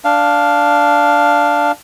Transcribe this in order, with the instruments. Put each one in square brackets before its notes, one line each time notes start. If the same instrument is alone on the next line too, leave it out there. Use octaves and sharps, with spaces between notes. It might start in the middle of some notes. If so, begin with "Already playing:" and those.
[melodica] D4 F5